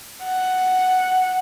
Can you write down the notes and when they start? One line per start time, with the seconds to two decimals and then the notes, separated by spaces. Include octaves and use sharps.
0.23 F#5